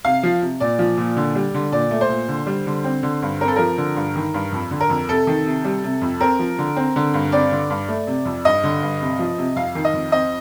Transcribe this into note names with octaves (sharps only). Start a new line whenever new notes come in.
C3 F5
F3
C3
A#2 D5
F3
A#2
D3
G3
D3
A#2 D5
A3
C5
A#2
D3
G3
D3
C4
D3
G2
C4 A#4
A4
F3 A#4
D3
G2
D#3
G2
F2
D3
A#4
F2
C3 A4
D#3
C3
G3
C3
F2
C4 A#4
F3
D3
C4
D3
G2
C4 D5
D3
G2
A3
C3
F2
G2 D#5
D3
G2
C3
F3
C3
F2 F5
D#3
D#5
F2
C4 D#5